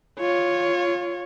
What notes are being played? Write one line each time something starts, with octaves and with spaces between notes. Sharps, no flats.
F4 C#5